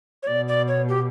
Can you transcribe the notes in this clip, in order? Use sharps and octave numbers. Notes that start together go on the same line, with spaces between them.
C#5
B2 D5
D5
C#5
G4